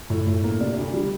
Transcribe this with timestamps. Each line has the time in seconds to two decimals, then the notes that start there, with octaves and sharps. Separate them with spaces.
0.10 A2
0.27 A2
0.44 A#3
0.60 C3 D5
0.77 D2
0.93 G3